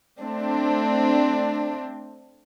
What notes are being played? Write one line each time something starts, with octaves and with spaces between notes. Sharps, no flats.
A3 C4 D4